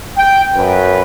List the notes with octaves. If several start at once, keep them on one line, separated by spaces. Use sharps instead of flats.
G5
F#2 B4